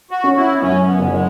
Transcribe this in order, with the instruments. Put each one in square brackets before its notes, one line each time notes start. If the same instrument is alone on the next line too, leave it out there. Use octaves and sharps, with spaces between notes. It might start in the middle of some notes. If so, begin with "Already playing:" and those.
[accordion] F#4
[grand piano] C#4
[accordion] E4
B3
[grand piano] F#2 [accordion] C#4
[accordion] B3
[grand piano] F#1
[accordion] G#3